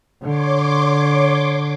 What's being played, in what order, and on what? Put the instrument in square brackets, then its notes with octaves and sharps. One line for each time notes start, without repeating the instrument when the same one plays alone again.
[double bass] D3 [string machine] C#5 C6 D6